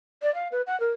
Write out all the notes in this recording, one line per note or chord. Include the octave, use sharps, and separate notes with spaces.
D5
F5
B4
F#5
A#4